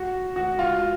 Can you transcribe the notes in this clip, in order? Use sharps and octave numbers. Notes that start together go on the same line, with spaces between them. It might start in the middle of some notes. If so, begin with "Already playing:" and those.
Already playing: F#4
F#4
F4